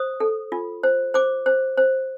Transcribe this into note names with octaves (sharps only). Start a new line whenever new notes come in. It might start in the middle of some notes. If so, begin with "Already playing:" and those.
Already playing: C5 D#6
A4
F4
C5
C5 D6
C5
C5